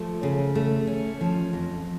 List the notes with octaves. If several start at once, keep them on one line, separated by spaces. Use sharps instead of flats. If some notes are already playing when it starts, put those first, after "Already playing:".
Already playing: F3 A3
C#3
A3
C#4
F3
F2